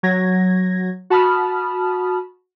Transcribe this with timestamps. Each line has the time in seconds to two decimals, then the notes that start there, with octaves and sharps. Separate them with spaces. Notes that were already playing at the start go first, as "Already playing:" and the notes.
0.03 F#3 G#6 A#6
1.10 F#4 A5 B5 D#6 F6